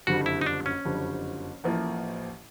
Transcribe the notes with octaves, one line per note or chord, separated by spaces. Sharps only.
F#1 F2 D3 G3 F#4
E4
D#4
D4
C#4
F#1 F2 D3 G3
A1 A2 F3 A#3